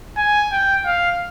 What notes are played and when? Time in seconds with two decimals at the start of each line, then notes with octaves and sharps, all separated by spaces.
0.17 G#5
0.52 G5
0.85 F5